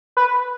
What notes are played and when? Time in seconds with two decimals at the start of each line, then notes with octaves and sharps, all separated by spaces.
0.17 B4